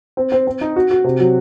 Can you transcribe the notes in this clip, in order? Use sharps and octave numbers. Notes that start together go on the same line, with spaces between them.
C4
C4
C4
D#4
F#4
F#4
C3
F#3